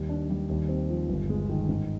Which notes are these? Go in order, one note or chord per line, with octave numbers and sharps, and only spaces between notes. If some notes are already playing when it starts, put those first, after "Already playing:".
Already playing: D#2 G3
D4
G3
D#2
C4
F3
G1
G#3
D#3
G#2